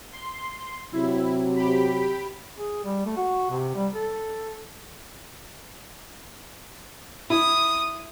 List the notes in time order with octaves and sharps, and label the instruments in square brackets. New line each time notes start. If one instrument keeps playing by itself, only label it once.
[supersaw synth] C6
[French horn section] C3 F#3 [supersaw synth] E4
[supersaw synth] G4 B5
[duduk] G#4
G3
A3
F#4
C3
G3
A4
[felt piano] E4 [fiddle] D#6